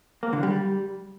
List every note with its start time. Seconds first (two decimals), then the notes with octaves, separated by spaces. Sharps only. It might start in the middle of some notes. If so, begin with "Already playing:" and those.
0.23 A#3
0.33 D3
0.43 G3